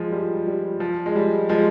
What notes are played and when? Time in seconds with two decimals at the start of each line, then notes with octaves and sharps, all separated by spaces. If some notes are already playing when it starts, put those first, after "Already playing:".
Already playing: F3 G#3
0.12 G3
0.47 G3
0.80 F3
1.06 G#3
1.15 G3
1.49 F3 G#3